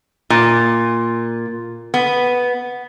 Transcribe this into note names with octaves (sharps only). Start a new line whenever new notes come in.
A#2
B3